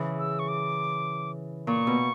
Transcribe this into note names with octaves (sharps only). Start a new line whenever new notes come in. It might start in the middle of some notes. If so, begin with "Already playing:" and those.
Already playing: C#3 E3
E6
C#6
D6
A#2 C#6
B2